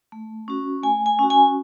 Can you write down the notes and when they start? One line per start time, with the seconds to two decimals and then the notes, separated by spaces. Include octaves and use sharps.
0.12 A3
0.48 C#4 F#4
0.83 A3 G#5
1.06 G#5
1.19 C#4 F#4
1.30 G#5